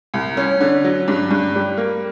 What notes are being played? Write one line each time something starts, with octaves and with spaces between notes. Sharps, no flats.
C2
C#4
D3
F#3
G2
G2
G3
A#3